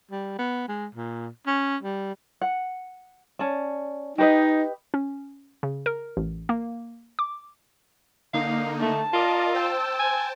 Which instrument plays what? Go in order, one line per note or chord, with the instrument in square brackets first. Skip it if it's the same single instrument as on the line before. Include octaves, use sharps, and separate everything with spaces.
[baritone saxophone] G3
B3
G#3
A#2
C#4
G3
[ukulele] F#5
C#4 D5 A5
[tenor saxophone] D#4 [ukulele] G4 B4 D#5
[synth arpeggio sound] C#4
C#3
A#4
A1
A#3
D6
[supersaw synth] D3 A#3 D#4 [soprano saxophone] F5
[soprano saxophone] A3 [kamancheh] A5
[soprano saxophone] F4 [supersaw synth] A#4 D5 D#5
[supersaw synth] C5 G5 A5 [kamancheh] E6
[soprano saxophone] G#5